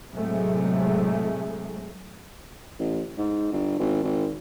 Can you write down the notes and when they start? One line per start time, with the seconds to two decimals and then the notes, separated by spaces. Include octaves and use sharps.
0.12 A2 C3 F#3 G#3 A3
2.79 A1
3.18 G#2
3.52 G1
3.79 G#1
4.04 G#1